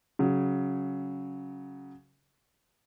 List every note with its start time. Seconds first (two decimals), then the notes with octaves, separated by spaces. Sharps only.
0.19 C#3 F#3